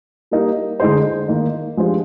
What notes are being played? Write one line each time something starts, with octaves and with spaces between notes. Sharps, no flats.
G3 A#3 D#4
D3 G#3 D#4 G#4 C5
D#3 A#3 D#4
F3 G#3 D4 G4 C5